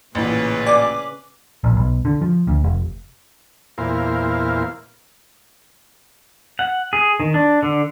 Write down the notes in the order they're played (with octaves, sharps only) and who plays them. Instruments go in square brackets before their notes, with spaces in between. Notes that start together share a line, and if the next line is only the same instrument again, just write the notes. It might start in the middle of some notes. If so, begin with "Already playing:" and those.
[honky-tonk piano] A1 A#2 [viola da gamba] C#3 C#4 B4
[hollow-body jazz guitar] D5 G#5 [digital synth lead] D6
[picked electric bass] A#1
B1
D3
F3
D2
F1
[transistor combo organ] E2 A#2 E4 A#4 C5 F5
[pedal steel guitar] F#5
G#4
D#3
D4
D3